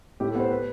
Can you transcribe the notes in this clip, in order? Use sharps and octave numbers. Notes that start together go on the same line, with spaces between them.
A2 G4
A4
B3 C5
B4